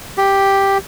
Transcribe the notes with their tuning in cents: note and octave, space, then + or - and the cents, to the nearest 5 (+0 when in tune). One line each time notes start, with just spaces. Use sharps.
G4 +0